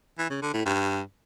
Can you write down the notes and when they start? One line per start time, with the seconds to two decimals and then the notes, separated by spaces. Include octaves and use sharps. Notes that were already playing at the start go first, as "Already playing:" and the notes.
0.19 E3
0.30 C#3
0.42 D3
0.54 A2
0.65 G2